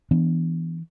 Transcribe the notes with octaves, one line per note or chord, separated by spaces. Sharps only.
E3 B3 D4